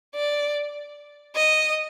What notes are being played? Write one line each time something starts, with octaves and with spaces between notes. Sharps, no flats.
D5
D#5